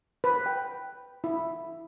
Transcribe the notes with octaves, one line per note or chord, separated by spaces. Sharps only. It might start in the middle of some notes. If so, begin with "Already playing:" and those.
B4
G5
E4